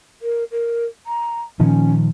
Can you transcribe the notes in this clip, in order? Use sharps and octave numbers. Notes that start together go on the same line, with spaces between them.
A#4
A#4
A#5
A#2 D#3 F3 C#4